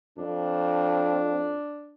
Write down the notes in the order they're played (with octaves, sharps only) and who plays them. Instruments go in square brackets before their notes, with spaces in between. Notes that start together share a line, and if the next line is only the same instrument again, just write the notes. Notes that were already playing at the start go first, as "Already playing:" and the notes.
[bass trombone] F2 [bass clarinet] D4